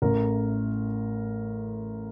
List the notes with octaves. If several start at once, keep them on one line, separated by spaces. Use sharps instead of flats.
A1 A2 A#4